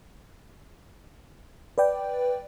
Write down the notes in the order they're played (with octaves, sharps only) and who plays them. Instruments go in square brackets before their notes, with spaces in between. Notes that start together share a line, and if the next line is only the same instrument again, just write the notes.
[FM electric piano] B4 D5 G5